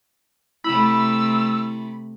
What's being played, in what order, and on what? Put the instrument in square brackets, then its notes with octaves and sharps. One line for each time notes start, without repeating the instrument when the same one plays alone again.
[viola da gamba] C3 A3 [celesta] E4 [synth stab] B5 [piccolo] E6